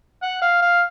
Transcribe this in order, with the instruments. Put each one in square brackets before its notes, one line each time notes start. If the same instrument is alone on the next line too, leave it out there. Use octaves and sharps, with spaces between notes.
[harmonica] F#5
F5
F5